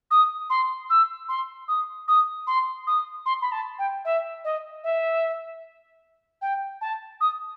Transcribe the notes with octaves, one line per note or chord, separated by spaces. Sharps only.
D#6
C6
E6
C6
D#6
D#6
C6
D#6
C6
B5
A5
G5
E5
D#5
E5
G5
A5
D#6